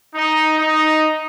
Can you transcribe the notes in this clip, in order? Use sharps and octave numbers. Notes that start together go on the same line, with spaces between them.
D#4
D#4